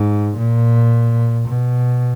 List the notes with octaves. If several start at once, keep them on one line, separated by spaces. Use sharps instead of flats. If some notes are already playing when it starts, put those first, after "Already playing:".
Already playing: G#2
A#2
B2